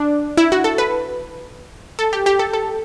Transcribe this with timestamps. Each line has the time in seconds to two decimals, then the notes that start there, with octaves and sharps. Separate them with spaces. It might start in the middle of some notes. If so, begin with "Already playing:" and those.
Already playing: D4
0.37 E4
0.52 F#4
0.64 A4
0.78 B4
1.99 A4
2.13 G4
2.26 G4
2.39 A4
2.53 A4